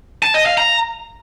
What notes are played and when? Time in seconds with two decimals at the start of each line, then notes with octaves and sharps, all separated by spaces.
0.23 A5
0.34 D#5
0.46 F5
0.58 A#5